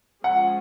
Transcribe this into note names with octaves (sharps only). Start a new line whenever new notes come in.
F3 G#3 C#4 F4 G#4 F#5